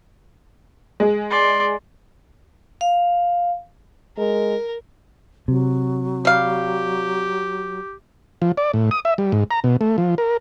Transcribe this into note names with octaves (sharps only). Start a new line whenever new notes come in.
G#3 G#4
D5 C6
F5
G#3 A#4
C3 F#3
G3 G4 F5
F3
D5
A2
D#6
E5
G3
G#2
A#5
B2
A3
F3
A#4